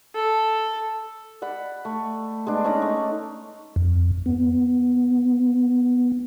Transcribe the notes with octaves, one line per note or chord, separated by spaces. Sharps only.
A4
D5 F#5 B5
A3
G#3 B3 D4
C#4 D#4 D5 A#5
A3
F2
B3